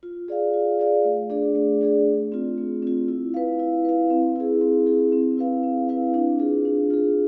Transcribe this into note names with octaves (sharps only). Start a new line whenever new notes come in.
F4
G#4 D5 F5
F4
G#4 D5 F5
A3
D4 G#4 D5
A3
D4 G#4 D5
A3
C4 F4
A3
C4 F4
E4
B4 F5
E4
B4 F5
C4
E4 G#4
C4
E4 G#4
C4
E4 B4 F5
C4
E4 B4 F5
D4
F4 G#4
D4
F4 G#4